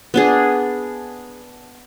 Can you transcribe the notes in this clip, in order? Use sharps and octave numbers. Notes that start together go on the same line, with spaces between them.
B3 D4 G#4